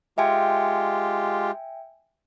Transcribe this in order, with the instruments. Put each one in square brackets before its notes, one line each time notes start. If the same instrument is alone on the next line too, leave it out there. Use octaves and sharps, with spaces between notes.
[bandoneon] G#3 F4 G4 [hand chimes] E5 G5 G#5